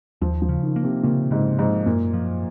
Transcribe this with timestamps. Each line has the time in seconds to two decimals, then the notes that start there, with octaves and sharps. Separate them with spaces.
0.21 D#2 F3
0.42 F3
0.49 C#3
0.63 D#3
0.76 A#3
0.83 C3
1.03 A#2 C#3
1.31 G#2 C#3
1.58 G#2 F3
1.86 F#2 A#2
2.14 F3